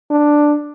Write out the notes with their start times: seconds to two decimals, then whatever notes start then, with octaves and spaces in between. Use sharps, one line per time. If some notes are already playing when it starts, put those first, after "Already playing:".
0.10 D4